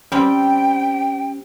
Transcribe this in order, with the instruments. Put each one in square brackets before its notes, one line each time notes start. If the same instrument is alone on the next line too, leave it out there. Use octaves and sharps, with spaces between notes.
[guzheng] G3 C4 [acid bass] C#4 [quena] G5